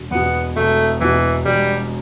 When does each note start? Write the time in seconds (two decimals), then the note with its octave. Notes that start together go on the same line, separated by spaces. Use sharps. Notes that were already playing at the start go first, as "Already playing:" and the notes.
Already playing: E1
0.11 E2 B2 B3
0.56 E1 A3
1.01 E2 B2 E3
1.45 E1 G3